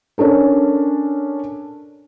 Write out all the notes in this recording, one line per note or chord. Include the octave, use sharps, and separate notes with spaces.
C#4 D4 A4 A#4